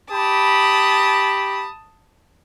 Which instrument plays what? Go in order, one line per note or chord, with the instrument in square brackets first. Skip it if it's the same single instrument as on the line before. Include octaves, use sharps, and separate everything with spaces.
[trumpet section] G4 B5 [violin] A5 D#6